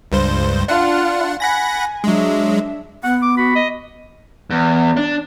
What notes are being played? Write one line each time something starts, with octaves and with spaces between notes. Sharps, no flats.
C#2 G2 C5
D4 F4 F5 F#5
F#5 G#5 B5 A#6
F#3 G#3 D4 E5
B3 F#5
D6
F#4 B5
D#5
E2
D4